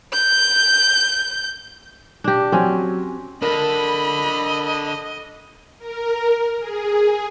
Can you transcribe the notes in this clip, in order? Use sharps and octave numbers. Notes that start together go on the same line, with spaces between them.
G6
D4 G4
F#3 C4 C#4 G#5
D4 A4 A#4 D#5 B5
A#4
G#4